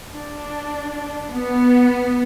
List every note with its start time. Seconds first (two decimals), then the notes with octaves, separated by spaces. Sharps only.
0.10 D4
1.31 B3